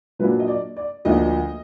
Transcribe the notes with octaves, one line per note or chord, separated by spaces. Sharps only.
A#2 F#3 A#3 D4 B4
D#5
D5
D5
D2 D3 F3 A#3 D4 D#5